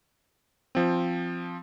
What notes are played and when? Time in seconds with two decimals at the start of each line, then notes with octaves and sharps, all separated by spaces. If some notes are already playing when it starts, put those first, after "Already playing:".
0.75 F3 C4